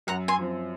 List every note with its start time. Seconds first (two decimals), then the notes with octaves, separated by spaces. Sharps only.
0.07 F#2 F#5 A#5
0.28 G#5 C6
0.39 F3 C4